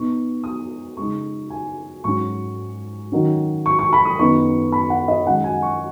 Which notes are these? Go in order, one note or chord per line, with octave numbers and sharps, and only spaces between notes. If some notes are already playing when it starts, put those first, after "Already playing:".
Already playing: B2 B3 D#4 C#6
D#6
C#3 G#3 D#4 C#6
G#5
G#2 F#3 C#4 C#6
D#3 F#3 C#4
C#6
C#6
B5
D#6
F#2 D#3 B3 D#4 C#6
B5
F#5
D#5
F#2 D#3 G#3 F#5
G#5
C#6